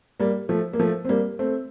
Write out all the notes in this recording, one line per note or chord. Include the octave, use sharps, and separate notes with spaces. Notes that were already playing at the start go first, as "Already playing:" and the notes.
G3 A#3
F3 A3
A#3
F3 A3
C4
G3 A#3
A3 C4